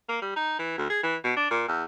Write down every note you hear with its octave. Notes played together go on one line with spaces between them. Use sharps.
A#3
G3
D#4
E3
D2
G#4
E3
B2
D4
A#2
E2